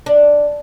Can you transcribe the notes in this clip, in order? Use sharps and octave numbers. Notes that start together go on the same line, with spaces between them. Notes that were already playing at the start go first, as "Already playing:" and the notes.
D4